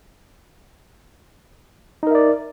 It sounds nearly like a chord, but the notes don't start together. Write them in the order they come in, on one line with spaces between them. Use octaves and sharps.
D#4 A#4 E5 D5